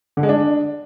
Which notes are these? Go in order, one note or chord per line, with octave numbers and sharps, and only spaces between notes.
D3
G#3
D4